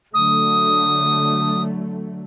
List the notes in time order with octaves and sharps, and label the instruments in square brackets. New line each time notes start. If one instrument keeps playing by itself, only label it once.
[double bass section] D3 F#3 A3 [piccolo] D#6